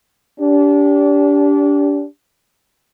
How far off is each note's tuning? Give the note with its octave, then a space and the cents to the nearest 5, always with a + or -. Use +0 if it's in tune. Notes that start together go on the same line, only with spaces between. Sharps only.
D4 -30 G4 +0